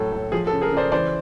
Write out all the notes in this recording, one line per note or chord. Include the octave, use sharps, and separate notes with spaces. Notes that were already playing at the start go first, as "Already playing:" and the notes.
Already playing: A2 F#3 A4
A2
F3 G#4
A4
C#3
G#4 A#4
C#3
C5 D5
E3 C5 D5